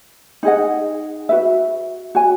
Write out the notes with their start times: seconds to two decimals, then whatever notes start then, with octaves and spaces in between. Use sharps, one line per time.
0.43 D#4 G#4 D#5 F#5
1.29 F#4 B4 E5
2.15 F#4 C#5 G#5